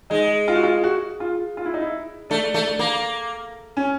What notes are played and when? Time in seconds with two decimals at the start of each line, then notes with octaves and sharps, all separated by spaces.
0.10 G#3 D#4
0.48 F4
0.55 F#4
0.63 F4
0.84 F#4
1.20 F4
1.57 F4
1.65 E4
1.74 D#4
1.82 E4
2.30 A3 D4
2.54 A3
2.79 A#3
3.77 C#4